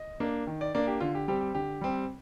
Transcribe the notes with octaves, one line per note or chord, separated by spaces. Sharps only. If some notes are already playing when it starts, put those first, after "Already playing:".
Already playing: D#5
A#3 D4
D#3
D5
A#3 D4 D5
G4
D3 F4
G4
G3 C4 G4
G4
D3 G4
G3 C4